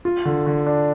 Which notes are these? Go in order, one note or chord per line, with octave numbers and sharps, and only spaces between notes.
F4
D3
D3
D4